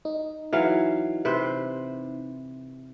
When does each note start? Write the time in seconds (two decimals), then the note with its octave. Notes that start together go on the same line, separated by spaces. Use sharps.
0.05 D#4
0.53 E3 F#3 F5
1.25 C3 B4 C5